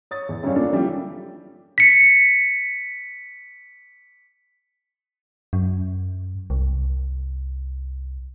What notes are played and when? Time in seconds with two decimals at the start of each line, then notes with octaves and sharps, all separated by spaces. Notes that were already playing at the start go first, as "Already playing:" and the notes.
0.11 C#5 D#6 A6
0.29 E2
0.43 F#2 C#3 G3 D4 C#5 F5
0.56 A#3 C#4 D4 F4 A4
0.72 E3 F3 G3 D4 F4 G4
1.78 B6 C#7
5.53 F#2
6.50 C2